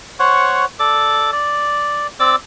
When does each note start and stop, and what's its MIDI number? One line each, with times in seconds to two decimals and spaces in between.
0.19 0.65 72
0.19 0.65 73
0.19 0.65 78
0.19 0.65 85
0.79 1.31 69
0.79 1.31 74
0.79 1.31 86
1.32 2.07 74
2.20 2.36 60
2.20 2.36 74
2.20 2.36 86
2.20 2.36 88